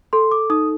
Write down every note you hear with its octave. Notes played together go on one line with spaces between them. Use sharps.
A4 C6
D6
D#4 D#6